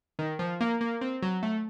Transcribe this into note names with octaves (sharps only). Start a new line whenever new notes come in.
D#3
F3
A#3
A#3
C4
F#3
A3